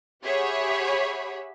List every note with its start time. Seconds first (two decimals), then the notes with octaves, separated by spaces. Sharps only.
0.24 G4 G#4 C#5 E5 F#5 B5